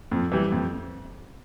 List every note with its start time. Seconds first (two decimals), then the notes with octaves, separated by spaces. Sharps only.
0.11 F2
0.32 E3 G3
0.52 F2